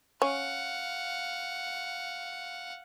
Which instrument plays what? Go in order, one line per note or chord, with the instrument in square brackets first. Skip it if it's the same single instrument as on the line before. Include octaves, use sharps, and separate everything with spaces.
[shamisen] C#4 [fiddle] F5 F#5